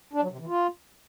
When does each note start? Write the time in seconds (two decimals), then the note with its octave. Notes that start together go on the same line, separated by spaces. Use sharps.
0.13 D4
0.22 F#3
0.31 C3
0.39 E3
0.48 F4